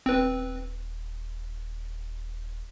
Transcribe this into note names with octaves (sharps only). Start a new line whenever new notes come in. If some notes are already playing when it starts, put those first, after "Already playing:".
D#1 C4 B4